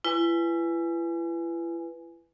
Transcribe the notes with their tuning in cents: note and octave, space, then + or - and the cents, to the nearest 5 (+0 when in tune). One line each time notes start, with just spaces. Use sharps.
E4 +40 B4 +0 G#5 +0